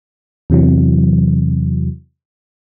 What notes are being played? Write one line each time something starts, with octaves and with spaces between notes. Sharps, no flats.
E2 C3 E3 F#3